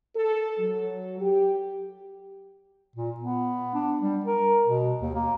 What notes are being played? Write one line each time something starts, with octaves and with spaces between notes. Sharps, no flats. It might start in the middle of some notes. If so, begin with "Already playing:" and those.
A4
F#3
G4
A#2
B3
D4
G3
A#4
B2
D#2
A#3